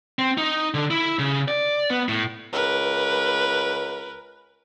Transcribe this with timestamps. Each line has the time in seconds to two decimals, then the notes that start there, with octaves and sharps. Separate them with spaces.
0.19 C4
0.38 D#4
0.74 D3
0.91 E4
1.19 C#3
1.48 D5
1.90 B3
2.08 A2
2.53 C#2 A#4 B4